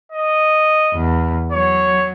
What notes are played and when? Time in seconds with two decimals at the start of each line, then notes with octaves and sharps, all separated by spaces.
0.12 D#5
0.94 E2
1.52 F#3 C#5